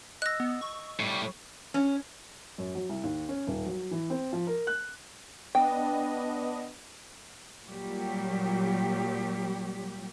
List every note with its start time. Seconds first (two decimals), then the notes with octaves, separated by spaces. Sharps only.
0.22 D#5 E6 F#6 A#6
0.40 B3
0.61 C#6
1.00 A2 G3
1.74 C#4
2.58 F#2
2.75 F#3
2.89 C2
3.03 D#2
3.29 C#4
3.47 D#1
3.66 F#3
3.91 E3
4.10 C4
4.33 F3
4.47 A#4
4.67 F#6
5.55 B3 D4 D#5 G5
7.68 A#2 F#3 G3 G4